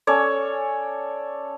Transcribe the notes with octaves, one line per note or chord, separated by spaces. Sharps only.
C#4 A4 C#5 D5